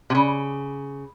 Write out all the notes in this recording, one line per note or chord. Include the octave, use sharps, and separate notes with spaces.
C3
C#3